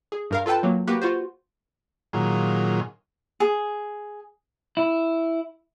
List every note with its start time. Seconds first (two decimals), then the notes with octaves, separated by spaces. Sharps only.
0.12 G#4
0.31 G2 A#4 F5
0.46 F4 A4 B4 G5 A5
0.63 F#3 A#3
0.87 A#3 F#4 G4 B4
1.02 F4 F#4 C5
2.13 A#2 D#3 F#3 F4 G#4
3.40 G#4
4.77 E4